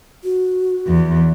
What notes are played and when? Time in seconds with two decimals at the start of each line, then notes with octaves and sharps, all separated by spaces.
0.24 F#4
0.87 E2